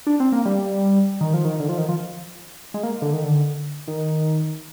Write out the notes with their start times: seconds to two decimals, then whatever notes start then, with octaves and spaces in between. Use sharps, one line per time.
0.07 D4
0.20 C4
0.32 A#3
0.45 G3
1.21 D#3
1.34 F3
1.45 D#3
1.60 D3
1.69 F3
1.78 D#3
1.89 F3
2.74 G#3
2.83 A#3
3.02 D3
3.13 D#3
3.24 D3
3.88 D#3